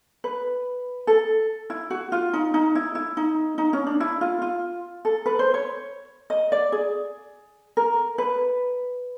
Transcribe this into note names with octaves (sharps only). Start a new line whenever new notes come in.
B4
A4
E4
F#4
F4
D#4
D#4
E4
E4
D#4
D#4
C#4
D4
E4
F4
F4
A4
B4
C5
C#5
D#5
D5
G#4
A#4
B4